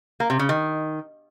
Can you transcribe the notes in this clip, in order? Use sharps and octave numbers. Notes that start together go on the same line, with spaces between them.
A#3
C3
C#3
D#3